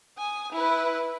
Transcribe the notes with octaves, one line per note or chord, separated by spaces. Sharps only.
G#5 D#6
E4 B4